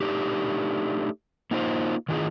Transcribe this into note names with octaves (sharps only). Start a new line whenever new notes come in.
A3 D4 D#4 G4
A#3 D#4 F4 B4 C5
D#3 E3 D#4 F4 G#4